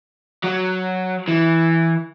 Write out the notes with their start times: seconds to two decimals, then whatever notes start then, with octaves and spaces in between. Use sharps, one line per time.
0.43 F#3
1.28 E3